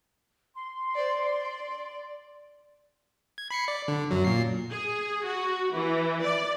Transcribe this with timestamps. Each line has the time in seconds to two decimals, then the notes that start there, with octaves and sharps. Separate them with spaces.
0.54 C6
0.95 C5 D5
1.24 D5
3.38 G#6
3.51 B5 C7 C#7
3.68 D5
3.88 D3
4.11 F#2 F#3
4.24 A#2 C7
4.70 G#4
5.25 F#4
5.74 E3
6.22 D5